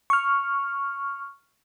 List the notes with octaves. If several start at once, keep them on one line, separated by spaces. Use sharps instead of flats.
C#6 F6